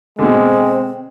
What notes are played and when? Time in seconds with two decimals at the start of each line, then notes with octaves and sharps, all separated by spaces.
0.19 B2 D3 G#3 C4